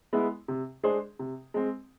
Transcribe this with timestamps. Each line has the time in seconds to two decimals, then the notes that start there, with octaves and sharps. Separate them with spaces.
0.13 G#3 B3 E4
0.48 C3
0.83 G#3 D4 G#4 C5
1.19 C3
1.54 G#3 C4